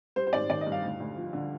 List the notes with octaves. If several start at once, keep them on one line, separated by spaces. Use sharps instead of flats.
G3 C5
C5
G#1 D5
D#3 D5
D#5
G2
F5
D2
D2
F3
D3